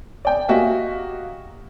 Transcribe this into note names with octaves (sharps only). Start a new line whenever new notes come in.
D5 G5
A#3 F#4 G4 D#5 E5 G#5